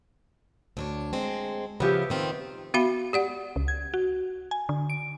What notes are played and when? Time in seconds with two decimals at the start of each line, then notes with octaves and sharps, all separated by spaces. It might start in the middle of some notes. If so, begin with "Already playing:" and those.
0.77 D2 D4 C#5
1.13 G#3 C4
1.80 C#3 F3 B3 G4 E5
2.10 D#3 C4 F4
2.74 B3 F#4 E5 F5 B5
3.13 G4 D5 F#5
3.56 C#2
3.68 G#6
3.94 F#4
4.51 G#5
4.69 D3
4.90 D7